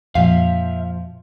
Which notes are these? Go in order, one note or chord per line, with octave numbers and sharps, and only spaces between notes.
F2 A#2 F3 E5 F5